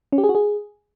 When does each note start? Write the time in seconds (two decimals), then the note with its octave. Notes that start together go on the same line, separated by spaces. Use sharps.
0.12 C#4
0.18 G4
0.24 G#4
0.29 F#4
0.35 G#4